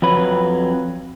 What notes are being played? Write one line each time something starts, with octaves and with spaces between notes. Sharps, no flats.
F2 F#3 B4